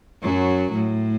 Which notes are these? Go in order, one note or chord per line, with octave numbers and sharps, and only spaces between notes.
F#2 F#3
A2